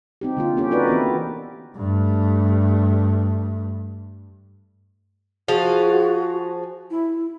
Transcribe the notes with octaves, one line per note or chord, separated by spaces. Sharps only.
C4 D#4 G4
D3 A#3 F4
C#4 G4
D#4 F#4 A#4 B4 D5
E3 B3 C4 E4
G2 A3
F3 F#4 G#4 F5
E4